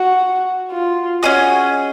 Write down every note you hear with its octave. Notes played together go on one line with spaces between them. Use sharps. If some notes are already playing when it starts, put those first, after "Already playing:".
Already playing: F#4
F4
C#4 F#4 G#4 D#5